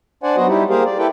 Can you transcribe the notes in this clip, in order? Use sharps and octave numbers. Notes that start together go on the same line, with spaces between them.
D4 C5 D5 F#5 G#5
F#3 B3 F#4 C5 D#5
G3 D#4 E4 G4
A#3 G4 G#4 A#4 C5 F5
D5
E4 G4 A4 B4 G5